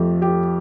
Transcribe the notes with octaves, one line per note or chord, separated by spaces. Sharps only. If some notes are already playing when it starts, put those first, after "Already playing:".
Already playing: F2 F3 A3 G4
G4